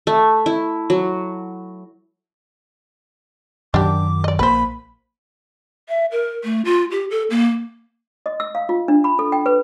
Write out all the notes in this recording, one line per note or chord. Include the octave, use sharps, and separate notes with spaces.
A3
E4
F#3
F#2 D#3 F#3 D4 G4 D6
D5 D#5
A#1 A#3 B4 C5 B5
E5
A#4
A3
F4
G4
A4
A#3
D#5
E6
F5
F4
D4
B5
A4
G5
B4